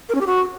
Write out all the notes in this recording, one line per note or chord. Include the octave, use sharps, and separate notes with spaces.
A#4
C#4
G4
F#4